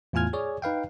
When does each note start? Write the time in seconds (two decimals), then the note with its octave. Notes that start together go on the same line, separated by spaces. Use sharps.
0.13 E2 A2 F4 G#5 F6 G#6
0.33 G#4 C#5 D5
0.62 D#4 B4 F5 G5